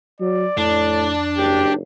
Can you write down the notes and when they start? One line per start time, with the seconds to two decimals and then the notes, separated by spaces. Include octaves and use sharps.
0.20 F#3 D5
0.57 F2 A2 D4
1.37 F#1 G4